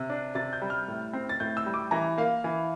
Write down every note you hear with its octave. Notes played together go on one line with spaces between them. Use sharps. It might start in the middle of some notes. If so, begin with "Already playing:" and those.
Already playing: C3
D4
C3 A6
G6
G3
F6
A2
C4
A6
A2 G6
E6
G3
D6
E3 A#5
A#3 F5
E3